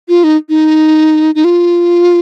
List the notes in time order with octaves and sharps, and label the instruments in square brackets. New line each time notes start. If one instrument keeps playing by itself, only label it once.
[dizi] F4
D#4
D#4
D#4
F4